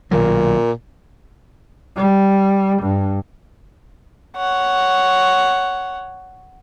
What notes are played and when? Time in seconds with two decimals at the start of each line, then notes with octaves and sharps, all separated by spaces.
0.11 B1 A#2 D#3 F#3
1.96 G3
2.82 G2
4.37 C#5 F#5